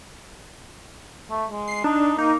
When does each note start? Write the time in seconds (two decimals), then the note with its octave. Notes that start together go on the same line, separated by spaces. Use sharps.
1.30 A3
1.50 G#3
1.68 C7
1.84 D4 D#4
2.18 A#3 D#4